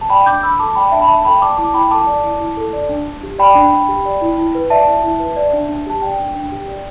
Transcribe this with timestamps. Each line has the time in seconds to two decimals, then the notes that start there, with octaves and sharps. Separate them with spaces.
0.01 A5
0.10 D5 G5 B5
0.26 D4 D6 G6
0.43 D4 B5 E6
0.59 A4 A5 D6
0.75 D5 G5 B5
0.92 D4 E5 A5
1.01 B5
1.08 D4 E5 A5
1.25 A4 G5 B5
1.41 D5 A5 D6
1.58 E4 A5 D6
1.74 E4 G5 B5
1.91 A4 A5 D6
2.07 D5
2.23 E4
2.40 E4
2.57 A4
2.73 D5
2.89 D4
3.07 D4
3.23 G4
3.39 D5 G5 B5
3.55 D4
3.72 D4
3.88 G4
4.05 D5
4.21 E4
4.38 E4
4.55 B4
4.70 D5 E5 A5
4.87 E4
5.04 E4
5.20 B4
5.36 D5
5.53 D4
5.69 D4
5.86 G4 A5
6.02 D5 G5
6.19 D4
6.35 D4
6.51 G4
6.68 D5